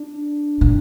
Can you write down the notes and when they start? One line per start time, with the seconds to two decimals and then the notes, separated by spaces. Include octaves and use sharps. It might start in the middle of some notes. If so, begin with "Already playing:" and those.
Already playing: D4
0.61 A#2